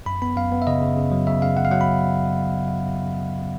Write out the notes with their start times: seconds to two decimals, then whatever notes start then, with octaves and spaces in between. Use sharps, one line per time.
0.06 F#2 B5
0.22 B3 B5
0.36 F#2 F5
0.52 B3
0.62 E5
0.67 C#3 D#5
0.82 C#3
0.97 C#3
1.12 F#3
1.27 C#3 E5
1.42 C#3 F5
1.56 C#3 F#5
1.65 F5
1.71 F#3 F#5
1.81 B5